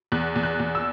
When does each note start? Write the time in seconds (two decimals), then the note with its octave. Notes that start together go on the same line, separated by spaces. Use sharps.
0.12 E2 F#6
0.36 E2
0.43 F#6
0.60 E2
0.75 E6